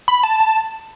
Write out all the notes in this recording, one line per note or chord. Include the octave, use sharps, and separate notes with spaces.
B5
A5
A5